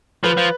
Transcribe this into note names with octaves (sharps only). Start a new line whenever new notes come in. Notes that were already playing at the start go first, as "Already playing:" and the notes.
F3 B4
F3